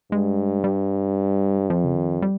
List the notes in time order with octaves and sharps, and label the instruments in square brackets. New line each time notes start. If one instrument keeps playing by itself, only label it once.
[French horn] G2 [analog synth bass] G#3
[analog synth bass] G3
[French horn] F2 [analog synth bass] F3
[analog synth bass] C#3
D#3
G3